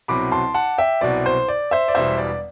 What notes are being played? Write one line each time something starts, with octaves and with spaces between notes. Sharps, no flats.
C2 B2 F#3 C4 B5 D6
A5 C6
F#5 A5
E5 G5
C2 B2 F#3 C4 D5
C5
D5
C5 E5
D5
E1 E2 B2 G3 C5 E5
D5